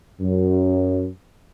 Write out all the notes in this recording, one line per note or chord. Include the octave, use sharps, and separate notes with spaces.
F#2